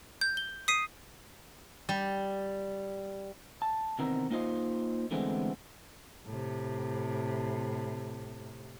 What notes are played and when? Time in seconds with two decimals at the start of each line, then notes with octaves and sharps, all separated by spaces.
0.21 G6
0.37 G7
0.68 D#6 B6 C7 D#7
1.89 G3
3.62 A5
3.99 C3 D#3 E3 B3 C4 A#4
4.30 A#3 D#4 F4 C5 D#5
5.11 D3 E3 G#3 A3 B3 C4
6.25 A2 C3